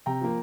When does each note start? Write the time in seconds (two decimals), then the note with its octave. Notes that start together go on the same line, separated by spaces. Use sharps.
0.06 C3 G5 A#5
0.21 F3 A#3